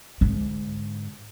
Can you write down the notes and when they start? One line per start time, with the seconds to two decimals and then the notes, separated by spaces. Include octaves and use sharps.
0.21 G#2 D3